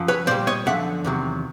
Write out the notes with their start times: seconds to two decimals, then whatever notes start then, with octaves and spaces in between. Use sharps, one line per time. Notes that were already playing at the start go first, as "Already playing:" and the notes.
Already playing: F#2 F3
0.08 B4 C#5
0.27 A#2 G3 C5 D5
0.47 C#5 D#5
0.66 F#2 D3 F3 E5 F#5
1.05 E2 C3 D#3 F#3